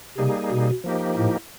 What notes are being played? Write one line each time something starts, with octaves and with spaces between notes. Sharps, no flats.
C3 G3 A#3 D#4 G#4
B2
F3 A#3 D#4 G4
A2